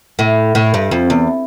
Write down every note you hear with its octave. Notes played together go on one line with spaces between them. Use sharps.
A2
A2
G2
F2
E2